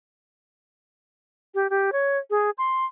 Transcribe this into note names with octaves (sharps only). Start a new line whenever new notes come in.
G4
G4
C#5
G#4
C6